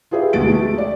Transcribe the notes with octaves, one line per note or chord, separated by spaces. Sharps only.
F4 G4 G#4 B4 E5
D2 B2 G#3 A6 D7
A3
D5